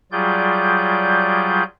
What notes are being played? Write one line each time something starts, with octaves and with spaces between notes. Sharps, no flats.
F#3 G3 F4 G#4 D5 G6